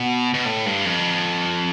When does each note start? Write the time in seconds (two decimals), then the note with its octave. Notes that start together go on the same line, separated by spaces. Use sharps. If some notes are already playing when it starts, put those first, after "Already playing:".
Already playing: B2
0.34 B2
0.45 A2
0.66 G2
0.85 F2